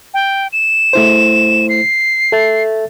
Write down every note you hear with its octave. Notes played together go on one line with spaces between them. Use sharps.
G5
E7
A3 E4 C5
C7
A4 E5 A6